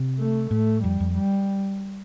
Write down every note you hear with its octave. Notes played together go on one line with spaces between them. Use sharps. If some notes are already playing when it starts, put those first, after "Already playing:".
Already playing: C3
A3
A2 A3
F2 G3
F2
G3